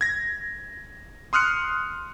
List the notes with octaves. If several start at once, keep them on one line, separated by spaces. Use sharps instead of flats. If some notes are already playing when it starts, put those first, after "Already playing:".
G#6 A#6
C6 D#6 F6 F#6 C#7